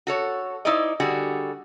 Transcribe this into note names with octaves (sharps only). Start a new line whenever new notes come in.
F#4 A4 C#5
D#4 E4 C5 D5 D#5
D3 G3 F#4 G#4